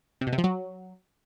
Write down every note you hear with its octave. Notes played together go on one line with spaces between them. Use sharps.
C3
B2
C3
F3
F#3